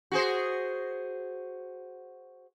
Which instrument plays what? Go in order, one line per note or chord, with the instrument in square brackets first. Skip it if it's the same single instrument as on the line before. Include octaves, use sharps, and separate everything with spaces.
[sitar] F#4 G#4 C5